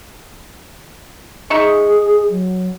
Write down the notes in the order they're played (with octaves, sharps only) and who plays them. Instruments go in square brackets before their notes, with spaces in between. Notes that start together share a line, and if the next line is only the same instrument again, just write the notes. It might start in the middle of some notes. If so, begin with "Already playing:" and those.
[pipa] D#4 E5 C#6 [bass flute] G#4
[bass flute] F#3